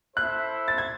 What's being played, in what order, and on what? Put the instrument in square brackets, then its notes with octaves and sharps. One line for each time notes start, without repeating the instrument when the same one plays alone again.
[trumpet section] E4 A4 C5 E5 [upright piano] F#6
[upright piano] A6
G#6